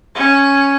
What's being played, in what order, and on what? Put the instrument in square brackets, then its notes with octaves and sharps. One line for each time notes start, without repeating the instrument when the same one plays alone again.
[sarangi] C#4